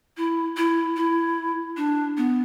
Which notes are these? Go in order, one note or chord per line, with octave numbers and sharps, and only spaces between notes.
E4
E4
E4
D4
B3